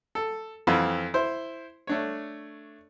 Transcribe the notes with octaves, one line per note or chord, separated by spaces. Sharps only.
A4
F2 E3 C4 F4
E4 C5
A3 D4 C#5